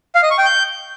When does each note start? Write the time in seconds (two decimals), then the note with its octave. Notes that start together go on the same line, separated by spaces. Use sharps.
0.15 F5
0.23 D#5
0.31 C#6
0.38 G5
0.46 G6